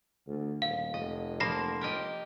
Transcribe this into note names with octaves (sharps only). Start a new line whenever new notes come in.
D2
D#1 F5
F1 D#5
F3 A#3 B5 A#6 C7
G4 A#4 D#5